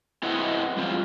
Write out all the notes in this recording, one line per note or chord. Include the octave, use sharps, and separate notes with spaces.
C4 E4 B4 D#5 F#5
G3 C4 F4